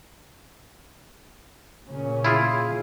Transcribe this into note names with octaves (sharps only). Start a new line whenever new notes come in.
A#2 C#3 C#4
E4 F4 G#4